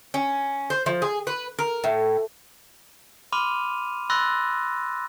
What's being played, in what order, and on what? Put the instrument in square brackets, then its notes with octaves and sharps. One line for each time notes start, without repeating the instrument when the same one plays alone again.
[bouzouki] C#4
C5
F3
G#4
B4
A#4
A2
[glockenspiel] B5 C6 D6 F6 D#7 F7
B5 C6 E6 F#6 A6 A#6